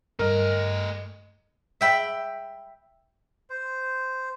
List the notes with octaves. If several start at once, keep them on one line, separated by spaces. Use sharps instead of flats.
G2 A3 A#4 D#5
E5 G5 B5
C5